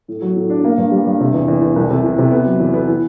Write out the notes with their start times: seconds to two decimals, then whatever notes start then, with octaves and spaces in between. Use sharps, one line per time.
0.08 A2
0.22 F#3
0.36 A2
0.50 D4
0.64 A#3
0.78 G2
0.92 G3
1.06 G2
1.20 C3
1.34 E2
1.48 E2
1.61 E2
1.76 C2
1.90 C3
2.03 E3
2.18 C3
2.31 B3
2.45 F#3
2.60 E2
2.74 B3
2.88 E3